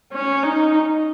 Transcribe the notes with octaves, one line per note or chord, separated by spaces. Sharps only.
C#4
D#4